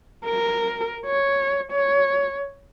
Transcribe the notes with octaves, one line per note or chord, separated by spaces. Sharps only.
A#4
C#5
C#5